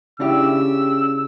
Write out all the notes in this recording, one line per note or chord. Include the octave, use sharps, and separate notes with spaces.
C#3 D4 E4 G4 E6